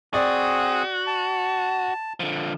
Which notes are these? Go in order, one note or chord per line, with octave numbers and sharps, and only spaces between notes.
C4 F#4 G#4 D5 D#6
A5
D3 F3